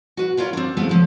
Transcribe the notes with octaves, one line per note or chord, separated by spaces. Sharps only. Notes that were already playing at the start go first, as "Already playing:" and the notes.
F#4 B4
E4 F4 A#4 C#5
C4 D4
G#3 A3 B3 C4 E4 F4
C#3 F3 A4